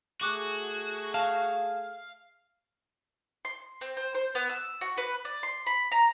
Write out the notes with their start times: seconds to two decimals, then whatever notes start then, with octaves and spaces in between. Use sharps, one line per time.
0.21 A3 F#4 G#4 C#6 D6 F#6
1.14 F5 A5
3.45 C6
3.81 C4
3.97 C5
4.15 C5
4.35 B3
4.49 E6
4.81 F#4
4.98 B4
5.25 D5
5.43 C6
5.66 B5
5.92 A#5